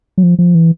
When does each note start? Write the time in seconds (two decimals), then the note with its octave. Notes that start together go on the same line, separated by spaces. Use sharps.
0.18 F#3
0.23 F3
0.39 F3
0.55 E3